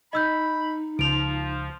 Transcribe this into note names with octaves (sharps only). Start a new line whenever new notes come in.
D#4 D#5 B5 E6 G6
C#2 F3 D7 F7